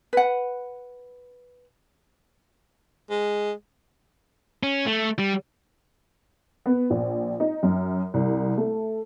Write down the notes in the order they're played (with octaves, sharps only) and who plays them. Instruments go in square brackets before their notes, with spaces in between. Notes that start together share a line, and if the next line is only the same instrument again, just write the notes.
[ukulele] B4 F#5
[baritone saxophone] G#3
[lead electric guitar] C#4
A3
G3
[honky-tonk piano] B3
A#1
D#4
F#2
C2
A3